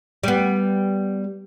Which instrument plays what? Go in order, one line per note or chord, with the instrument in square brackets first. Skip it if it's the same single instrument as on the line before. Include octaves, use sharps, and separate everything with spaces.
[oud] G3 B3